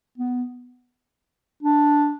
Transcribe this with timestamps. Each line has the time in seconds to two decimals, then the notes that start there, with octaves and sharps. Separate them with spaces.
0.18 B3
1.62 D4